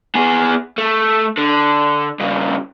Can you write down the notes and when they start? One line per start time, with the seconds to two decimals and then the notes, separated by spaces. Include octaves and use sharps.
0.15 B3 G#4
0.78 A3
1.38 D3
2.20 G2 C#3